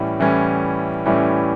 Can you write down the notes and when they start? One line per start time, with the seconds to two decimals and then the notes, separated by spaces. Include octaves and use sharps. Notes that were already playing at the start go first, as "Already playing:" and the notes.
Already playing: A2 E3 G3 C#4
0.20 A2 E3 G3 C#4
1.06 A2 E3 G3 C#4